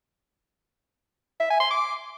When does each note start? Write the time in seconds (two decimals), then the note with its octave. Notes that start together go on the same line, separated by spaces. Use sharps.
1.40 E5
1.50 G#5
1.60 C6
1.70 D6